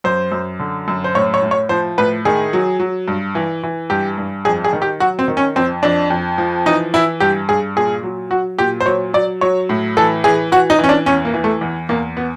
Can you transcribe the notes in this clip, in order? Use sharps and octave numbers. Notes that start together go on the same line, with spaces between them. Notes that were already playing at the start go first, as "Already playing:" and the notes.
F#2 C5
F#2
D3
F#2
C5
A2 C#5
C#5
A2
C#5
F3 C5
A2 B4
D#3 G#4
F#3
F#3
G2
E3
E3
G2 G4
G2
F2 G#4
G#4
D#3
G4
F#3 F#4
C4
D#3
C#4
F2 C4
F2 D4
F2
F3
E3 D#4
E3 E4
G2 G4
G2 G#4
A#2 G#4
F#3
F#3 F#4
A#2 G4
C5
F#3 C#5
F#3 D5
F#3 C#5
A2
E3 A4
E3 G#4
E3 F#4
D#4
E3 C#4
D4
E2 C#4
A#3
E3
A3
E2
E2 A#3
B3